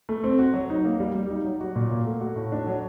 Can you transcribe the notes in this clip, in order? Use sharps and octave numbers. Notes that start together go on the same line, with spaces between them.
A3
C4
F#4
F#3
D#4
A#3
G3
G3
D#4
F#3
F#4
A#2
A#3
A3
F#4
A2
D4
F#3